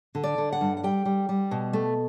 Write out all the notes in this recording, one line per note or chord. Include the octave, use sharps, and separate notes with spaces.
D3
D5
D3
F#5
G2
F#5
G3 G5
G3
G3
B2
A3